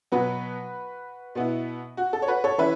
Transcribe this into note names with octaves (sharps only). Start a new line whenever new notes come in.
B2 F#3 B3 F#4 B4
B2 B3 E4
F#4
A4
C#5
F#4 B4
A4 C#5
E3 C#4 B4 E5